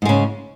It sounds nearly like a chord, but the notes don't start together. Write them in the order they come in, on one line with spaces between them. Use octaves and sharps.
G#2 G#3 C#3